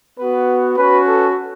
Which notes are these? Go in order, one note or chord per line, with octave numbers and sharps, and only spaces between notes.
B3 F#4 B4
C#4 F#4 B4
A4